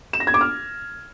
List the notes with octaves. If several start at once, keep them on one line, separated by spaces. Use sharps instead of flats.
E7
A#6
G#6
D6
F6